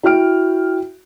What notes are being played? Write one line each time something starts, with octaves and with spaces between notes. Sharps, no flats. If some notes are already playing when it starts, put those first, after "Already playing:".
E4 F#4 G5 F6 D7